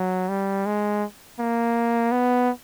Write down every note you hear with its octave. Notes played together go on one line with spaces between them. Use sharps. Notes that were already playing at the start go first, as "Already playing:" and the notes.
Already playing: F#3
G3
G#3
A#3
B3